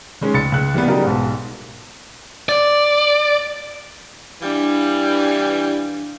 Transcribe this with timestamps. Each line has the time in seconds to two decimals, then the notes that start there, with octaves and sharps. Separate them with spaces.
0.21 D#3 G#3 C#4
0.34 C#2 B5 A6 C#7
0.52 C#2 F#6
0.74 E3 G3 A#3 B3
0.87 C#3 F#3 G3 D#4 G4 A#4
1.04 B1 G#2
2.49 D5
4.42 E3 G3 D4 F5